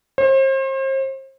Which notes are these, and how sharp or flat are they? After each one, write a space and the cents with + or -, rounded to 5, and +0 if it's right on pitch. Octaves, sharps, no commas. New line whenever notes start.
C5 +40